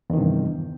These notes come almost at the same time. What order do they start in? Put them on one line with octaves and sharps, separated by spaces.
E2 D#3 C3 G2